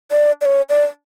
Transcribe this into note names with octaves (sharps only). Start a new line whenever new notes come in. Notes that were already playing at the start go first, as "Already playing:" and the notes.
D5
D5
C#5
D5